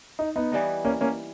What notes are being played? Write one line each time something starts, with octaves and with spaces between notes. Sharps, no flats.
D#4
B3 D#4
E3 G3 B3 D#4
A#3 C#4
A#3 C#4